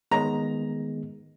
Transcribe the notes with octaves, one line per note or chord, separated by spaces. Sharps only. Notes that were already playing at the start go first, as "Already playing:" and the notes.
D#3 G#3 B3 A#5